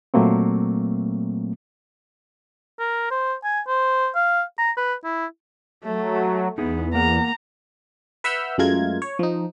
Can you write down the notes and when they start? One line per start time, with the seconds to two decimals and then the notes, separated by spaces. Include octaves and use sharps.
0.14 A#2 F#3 A3 A#3 C4
2.80 A#4
3.11 C5
3.44 G#5
3.67 C5
4.15 F5
4.59 A#5
4.77 B4
5.04 E4
5.84 F#3 A3
6.58 E2 B3 D#4 E4 G#4
6.94 A#3 A#4 F#5 A#5
8.24 B4 E5 F#5 E6 F6 G6
8.58 F#2 G#3 A3 F4 A#4 G#6
9.02 C#5
9.19 F3 D#4